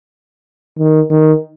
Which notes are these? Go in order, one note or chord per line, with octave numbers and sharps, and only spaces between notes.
D#3
D#3